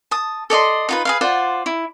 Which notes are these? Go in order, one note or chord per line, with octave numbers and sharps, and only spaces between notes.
A5 D#6
A4 D5 D#5 C6
D#4 F4 B4
G#4 B4 F5
F4 C5 D5 F#5
E4